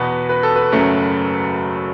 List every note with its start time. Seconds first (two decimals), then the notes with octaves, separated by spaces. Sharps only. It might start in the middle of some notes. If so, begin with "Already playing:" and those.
Already playing: E2 B2 B3 B4
0.29 B4
0.43 A4
0.56 B4
0.72 F#1 F#2 F#3 A3